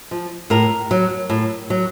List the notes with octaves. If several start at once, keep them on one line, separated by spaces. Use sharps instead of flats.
F3
A2 A#4
F#3
A2
F#3